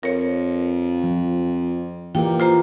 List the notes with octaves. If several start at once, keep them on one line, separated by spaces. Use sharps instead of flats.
F2 A#4 C#5
F3
A#2 E3 G4 A#4 G5
F4 C5 A#5